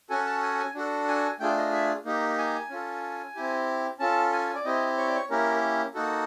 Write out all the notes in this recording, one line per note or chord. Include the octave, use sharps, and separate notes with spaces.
C#4 F#4 A4 G#5
A5
G#5
G#5
D4 F#4 A4
G#5
A3 D4 F4 G#4 G5
D#5
E5
A#3 D#4 G4
G#5
C#4 F4 A4
C4 E4 G4
C#4 F4 A4 A5
G#5
D5
C4 E4 G4 D#5
C#5
D5
C#5
A#3 C#4 E4 G4 A#4
A#3 D#4 F#4 A4